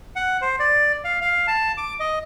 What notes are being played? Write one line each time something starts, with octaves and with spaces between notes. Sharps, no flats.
F#5
C5
D5
F5
F5
A5
D6
D#5